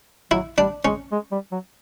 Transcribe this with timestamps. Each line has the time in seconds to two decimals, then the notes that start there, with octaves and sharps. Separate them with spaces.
0.31 F#3 E4
0.58 G3 D4
0.85 G#3 C#4
1.12 G#3
1.32 G3
1.52 F#3